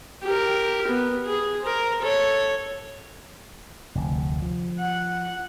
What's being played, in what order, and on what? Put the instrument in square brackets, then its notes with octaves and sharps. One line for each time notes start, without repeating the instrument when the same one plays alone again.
[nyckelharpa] G4 A#4
B3
G#4
A#4 C5
A4 C#5
[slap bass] F1 D2
F3
[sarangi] F#5